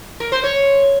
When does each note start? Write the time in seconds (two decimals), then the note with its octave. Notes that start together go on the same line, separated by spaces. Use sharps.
0.20 A#4
0.32 C5
0.44 C#5